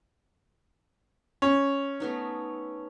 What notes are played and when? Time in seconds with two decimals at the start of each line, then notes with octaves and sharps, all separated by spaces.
1.42 C#4
2.00 A3 B3 D#4